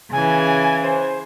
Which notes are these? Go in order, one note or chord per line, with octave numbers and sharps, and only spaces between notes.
C#3 E3 G#5
C5